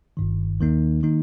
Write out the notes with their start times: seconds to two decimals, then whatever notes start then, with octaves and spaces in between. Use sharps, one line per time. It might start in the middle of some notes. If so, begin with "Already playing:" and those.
0.17 G1 G2 D#3
0.60 D#2 D#3 A#3 D#4
1.03 D#3 A#3 D#4